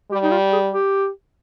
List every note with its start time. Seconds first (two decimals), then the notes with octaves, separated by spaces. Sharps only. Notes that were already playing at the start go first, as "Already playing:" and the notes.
0.11 G3 G4
0.23 D#4
0.31 F4
0.52 G#4
0.72 G4